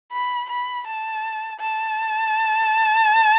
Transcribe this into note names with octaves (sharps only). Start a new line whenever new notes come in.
B5
B5
A5
A5